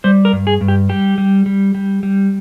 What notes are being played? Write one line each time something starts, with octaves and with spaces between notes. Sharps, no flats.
G3 C5
A#4
G2
G#4
G2
G4
G3 G4
G3
G3
G3
G3